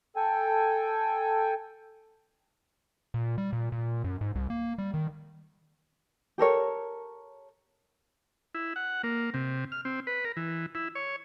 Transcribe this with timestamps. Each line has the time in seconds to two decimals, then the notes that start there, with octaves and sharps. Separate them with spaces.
0.16 A4 G5 G#5
3.14 A#2
3.38 G3
3.53 A#2
3.72 A#2
4.04 F#2
4.21 G#2
4.35 C2
4.50 A#3
4.78 G3
4.94 D#3
6.38 G4 A4 A#4 C#5
8.55 E4
8.76 F#5
9.04 A#3
9.34 C3
9.72 F6
9.85 C4
10.07 B4
10.25 A#4
10.37 E3
10.75 E4
10.95 C#5